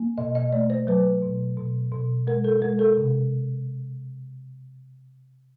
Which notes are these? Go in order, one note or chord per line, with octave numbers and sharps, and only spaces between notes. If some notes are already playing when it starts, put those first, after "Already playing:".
Already playing: A#3
B2 D#5
D#5
A3 D5
C5
F#3 B4
B2
B2
B2
G#3 A#4
A4
G#3 A#4
A4
C3